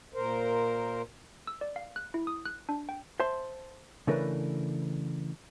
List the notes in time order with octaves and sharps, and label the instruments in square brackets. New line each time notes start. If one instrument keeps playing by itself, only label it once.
[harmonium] A#2 A#4 C5
[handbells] E6
D5
F5
F#6
E4
D#6
F#6
D4
G5
[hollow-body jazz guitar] C5 E5 A5 C6
C#3 E3 A3 D4 A#4 B4